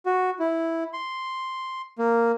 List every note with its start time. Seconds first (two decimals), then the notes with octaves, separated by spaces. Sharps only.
0.06 F#4
0.40 E4
0.93 C6
1.99 A#3